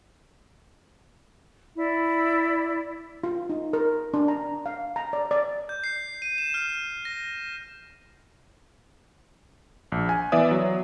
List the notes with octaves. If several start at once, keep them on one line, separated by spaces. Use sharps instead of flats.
E4 D5
F4
D#4
A#4
D4
A#5
F5
A#5
D5
D5
G6
C7
D#7
E7
F6
A#6
A#1
G#5
E3 B3 D5 E5 D#6
F#3